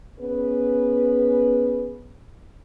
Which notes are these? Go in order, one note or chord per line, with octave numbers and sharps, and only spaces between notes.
B3 C#4 G#4 B4